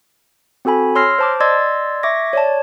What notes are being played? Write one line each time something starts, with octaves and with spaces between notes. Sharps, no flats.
C4 F#4 A4 G#5 B5
C#5 C6 E6 F6 A#6 C7
C5 A5 D6
D5 D#5 C6 E6 G#6 A6
E5 C#6 D6 G#6 A#6
C#5 D5 A5